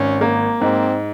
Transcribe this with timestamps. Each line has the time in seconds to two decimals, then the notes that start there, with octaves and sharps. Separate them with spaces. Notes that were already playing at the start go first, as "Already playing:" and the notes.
Already playing: G#1 C#4
0.21 A#3
0.60 G#2 C4